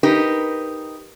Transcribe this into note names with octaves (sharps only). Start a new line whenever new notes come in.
D#4 G4 A#4 B4